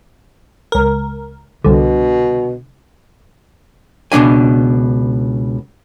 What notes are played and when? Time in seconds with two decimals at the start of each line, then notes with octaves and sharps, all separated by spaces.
0.72 C#2 A#4
1.64 C2 B2 D3
4.12 C#2 B2 A#3 D4 G#5